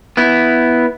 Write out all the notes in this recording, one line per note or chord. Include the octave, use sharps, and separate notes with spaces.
B3 E4